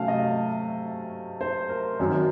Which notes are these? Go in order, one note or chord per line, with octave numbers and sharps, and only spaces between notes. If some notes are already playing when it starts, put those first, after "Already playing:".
Already playing: C3 F#3 A3 C#4 F5 A5
D#5
C5
A#4
F#2 D#3 F#3 C4